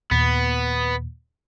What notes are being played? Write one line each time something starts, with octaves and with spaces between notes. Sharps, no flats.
D#2 A#2 B3